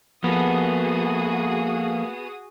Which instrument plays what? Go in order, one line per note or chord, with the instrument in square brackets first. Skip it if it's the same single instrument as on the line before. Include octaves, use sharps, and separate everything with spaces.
[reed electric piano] F3 [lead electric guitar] A#3 A4 [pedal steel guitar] B3 [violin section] F#4 G#4 D#6